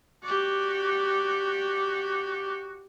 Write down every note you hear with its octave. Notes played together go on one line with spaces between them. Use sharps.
F#4 G4 D5